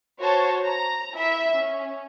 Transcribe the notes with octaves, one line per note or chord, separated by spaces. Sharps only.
F#4 C5 C#5 A5
A#5
E4 E5
C#4